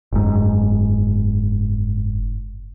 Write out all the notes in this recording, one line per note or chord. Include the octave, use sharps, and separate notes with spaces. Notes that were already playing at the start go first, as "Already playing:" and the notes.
F#1 G#2